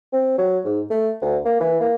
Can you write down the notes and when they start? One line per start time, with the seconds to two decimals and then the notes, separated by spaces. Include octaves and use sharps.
0.13 C4
0.38 F#3
0.65 G#2
0.90 A3
1.22 D2
1.45 A#3
1.60 E3
1.80 A#3